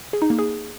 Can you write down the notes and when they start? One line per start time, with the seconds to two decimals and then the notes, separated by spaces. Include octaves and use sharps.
0.13 G#4
0.22 D#4
0.30 A#3
0.39 G#4